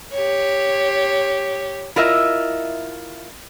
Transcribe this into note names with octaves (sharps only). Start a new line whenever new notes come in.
G4 C#5
E4 F4 A#4 D#5 E5